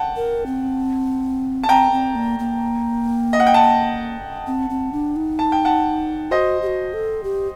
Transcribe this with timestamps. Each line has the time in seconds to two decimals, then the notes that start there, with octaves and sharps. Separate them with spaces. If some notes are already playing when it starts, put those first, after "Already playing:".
Already playing: F#5 G5 A5
0.16 A#4
0.46 C4
1.64 A5
1.69 C4 G5 A#5
1.92 C4
2.15 A#3
2.39 A#3
3.33 D#5
3.40 F#5
3.47 G5
3.54 F#5 A5
4.47 C4
4.70 C4
4.93 D4
5.16 D#4
5.39 A5
5.52 G5
5.65 F#5 A5
6.31 F#4 C5 D#5
6.62 G4
6.67 F#4
6.94 A4
7.23 G4